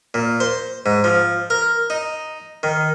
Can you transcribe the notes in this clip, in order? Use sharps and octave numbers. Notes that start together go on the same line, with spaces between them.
A#2
C5
G#2
F3
A#4
D#4
D#3